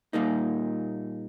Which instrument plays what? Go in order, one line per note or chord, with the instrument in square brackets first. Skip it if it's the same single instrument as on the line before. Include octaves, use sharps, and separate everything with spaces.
[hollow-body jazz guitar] A#2 G3 A#3 D#4